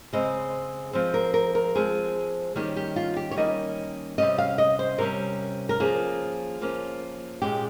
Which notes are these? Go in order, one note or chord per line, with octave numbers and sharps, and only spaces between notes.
C#3 G#3 C4 D#5
F3 G#3 C4
A#4
A#4
A#4
F3 G#3 C4 G#4
D#3 G3 A#3 C#4 G4
G4
F4
G4
C#5
D#3 G3 A#3 C#4 D#5
C3 G3 C#4 D#5
F5
D#5
C5
C3 G3 C#4 A#4
A#4
F3 A#3 C#4 G#4
F3 A#3 C#4
A#2 G#3 C#4 G4